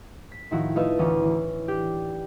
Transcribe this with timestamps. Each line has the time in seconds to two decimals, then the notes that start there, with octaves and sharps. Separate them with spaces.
0.32 B6
0.51 A2 D#3 F3 D#4 E4 F#4
0.75 A3 D#4 F4 B4 D#5 E5
0.99 D2 E3 C#4 D#6 D#7
1.24 E3
1.68 D4 G4 D5 G6